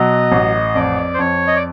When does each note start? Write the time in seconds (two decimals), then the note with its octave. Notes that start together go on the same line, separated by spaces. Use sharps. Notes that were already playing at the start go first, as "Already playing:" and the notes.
Already playing: B2 F#3 D#5
0.32 A1
0.75 F2 D5
1.14 C5
1.19 F2 C#5
1.47 D#5
1.56 D5